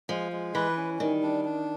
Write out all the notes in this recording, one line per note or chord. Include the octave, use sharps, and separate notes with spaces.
F3 G#3
G#3
E3 B4
C#4
D#3 G3
D4
D4